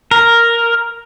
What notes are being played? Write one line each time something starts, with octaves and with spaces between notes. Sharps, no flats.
A#4